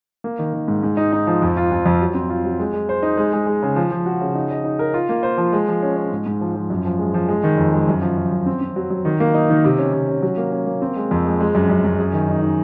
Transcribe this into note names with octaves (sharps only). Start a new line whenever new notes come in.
A#3
D#3
D#3
G#2
G#2
D#4
D#4
F3
F2
F4
F2
F2
F#3
C4
F4
F#3
G#3
G#3
C5
D#4
G#3
G#3
G#3
C#3
F3
F3
F#4
C#3
D#4
D#5
D#4
A#4
F4
A#3
C5
F3
G#3
F3
C#4
C#4
G#2
G#2
F3
F3
F#2
F3
G#3
F3
G#3
D#3
F2
G#3
F#2
F3
F3
F#2
C4
C4
F#3
F#3
D#3
A#3
D#4
D#3
C3
C#4
C3
C#4
F#3
A#3
C#4
A#3
C4
G#3
F2
G#3
G#3
F#2
F#2
F#2
G#4
D#3
D#4
D#4